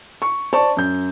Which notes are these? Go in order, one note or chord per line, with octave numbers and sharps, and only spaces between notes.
C#6
C5 D5 A5 C#6
F#2 G6